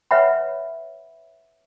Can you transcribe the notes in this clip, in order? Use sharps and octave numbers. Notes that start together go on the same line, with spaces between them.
B4 C#5 E5 F#5 B5